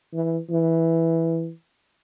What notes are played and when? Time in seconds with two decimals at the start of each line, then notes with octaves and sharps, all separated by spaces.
0.14 E3
0.50 E3